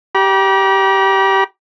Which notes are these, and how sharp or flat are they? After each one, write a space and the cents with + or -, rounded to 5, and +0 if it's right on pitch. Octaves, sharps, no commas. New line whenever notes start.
G4 -15 A#5 +45